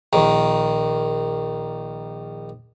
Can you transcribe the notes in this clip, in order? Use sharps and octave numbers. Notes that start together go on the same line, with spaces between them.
A#1 D#3